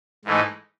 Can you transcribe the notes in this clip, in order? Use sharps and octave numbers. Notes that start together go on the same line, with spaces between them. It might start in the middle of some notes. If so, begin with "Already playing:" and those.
G#2 E3 A3 D#4